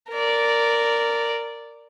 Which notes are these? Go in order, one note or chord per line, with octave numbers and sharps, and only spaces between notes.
A#4 D5